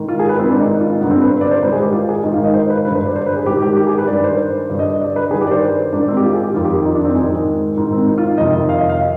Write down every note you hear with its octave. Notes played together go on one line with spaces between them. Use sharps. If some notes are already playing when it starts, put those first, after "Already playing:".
Already playing: G#2 D#3
F4
G#4
B4
G#2 D#3 C4
D4
D#4
D#4
F4
G2 D3 B3
C4
B4
C5
D5
C5
G#2 D#3 B4
G#4
G4
F4
G#4
G#2 D#3 D#5
F5
D#5
C5
B4
G2 D3 B4
C5
D5
C5
B4
G#4
G#2 D#3 G4
G4
G4
G#4
B4
G2 D#3 D5
C5
G2 D3 D5
D#5
D#5
D5
B4
G2 D#3 G#4
G4
D5
C5
G#2 D#3 D4
C4
G4
F4
G#4
G4
F2 D#3 F4
G4
D#4
D4
C4
G#2 D#3 G#3
G#2 D#3
C4
D#4
F4
F2 C3 D#3 D#5
F5
D#5
F5
D#5